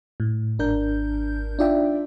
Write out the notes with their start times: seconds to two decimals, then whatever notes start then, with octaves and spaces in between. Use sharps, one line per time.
0.20 A2
0.59 G#1 D4 A#4 G6
1.59 D4 D#4 F4 D5 E5 G5